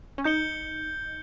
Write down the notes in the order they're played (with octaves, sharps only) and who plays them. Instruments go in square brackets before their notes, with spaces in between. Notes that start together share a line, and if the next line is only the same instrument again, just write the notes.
[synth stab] C#4
[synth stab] D#4 [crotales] G6 C#7 G7